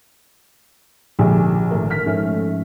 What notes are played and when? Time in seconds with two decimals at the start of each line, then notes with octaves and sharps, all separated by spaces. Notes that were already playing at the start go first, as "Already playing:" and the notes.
1.19 A#1 G#2 D3 G4 G#4
1.71 G#1 A3 A#4
1.90 F6 B6
2.06 G#2 F3 A3 C#4